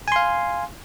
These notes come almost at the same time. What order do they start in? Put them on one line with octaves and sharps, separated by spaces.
G#5 C6 F5